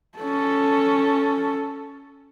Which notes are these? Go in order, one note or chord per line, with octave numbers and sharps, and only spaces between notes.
C#4 A4